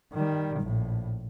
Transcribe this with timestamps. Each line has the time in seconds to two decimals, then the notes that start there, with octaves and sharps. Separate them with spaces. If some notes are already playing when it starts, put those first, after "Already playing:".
0.13 D#3 G3
0.60 A#1 A2